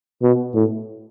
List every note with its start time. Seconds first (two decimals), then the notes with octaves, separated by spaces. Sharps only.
0.22 B2
0.55 A2